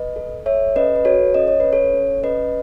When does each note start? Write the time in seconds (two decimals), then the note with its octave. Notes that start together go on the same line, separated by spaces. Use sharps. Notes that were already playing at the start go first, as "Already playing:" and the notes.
Already playing: B4 D#5
0.16 A4
0.46 A4 C#5 E5
0.76 C#4 B4 D#5
0.96 B4
1.05 F#4 A4 C#5
1.34 C#4 D#5
1.48 C#5
1.60 C#4 B4
1.73 A4 C#5
1.94 C#4
2.23 C#4 B4 D#5